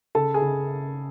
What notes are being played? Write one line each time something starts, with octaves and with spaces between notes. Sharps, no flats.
C#3 A4 A5
G#4 G#5
C#3